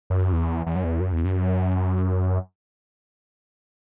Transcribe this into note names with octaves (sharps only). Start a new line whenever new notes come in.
F#2
E2
E2
F#2
E2
F#2
E2
F#2